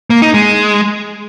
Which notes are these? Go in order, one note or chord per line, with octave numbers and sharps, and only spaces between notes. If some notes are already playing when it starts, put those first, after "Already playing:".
A#3
D#4
G#3